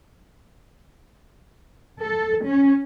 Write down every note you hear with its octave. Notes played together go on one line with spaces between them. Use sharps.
A4
C#4